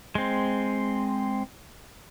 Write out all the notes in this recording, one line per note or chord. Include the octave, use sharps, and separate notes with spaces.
G#3 C4